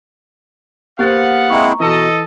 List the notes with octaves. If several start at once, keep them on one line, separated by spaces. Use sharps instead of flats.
A#3 B3 G4 C5 F5 F#5 A6
G#3 C4 E4 A#5 C#6
B2 E3 A4 D#5